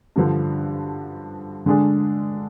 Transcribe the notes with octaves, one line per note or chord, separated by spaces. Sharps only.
G2 D3 F3
D3 G#3 D4 G#4